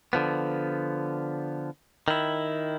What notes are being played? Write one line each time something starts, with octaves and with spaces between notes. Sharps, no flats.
D3 F3 B3
D#3 E4